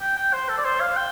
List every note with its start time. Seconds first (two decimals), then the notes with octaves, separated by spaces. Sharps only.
0.01 G5
0.17 G5
0.33 C5
0.49 A4
0.58 D5
0.65 C5
0.81 F5
0.97 G5